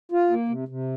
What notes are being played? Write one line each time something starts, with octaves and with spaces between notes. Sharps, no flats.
F4
A#3
C3
C3